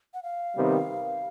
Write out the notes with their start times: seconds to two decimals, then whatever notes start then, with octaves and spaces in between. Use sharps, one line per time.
0.14 F#5
0.23 F5
0.56 C3 D#3 G3 B3